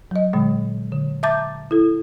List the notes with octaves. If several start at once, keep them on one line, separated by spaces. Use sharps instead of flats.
F#3 D#5
A#2 D3 G#3
D3
E5 A5 A#5 D6 G6 A6
E4 A4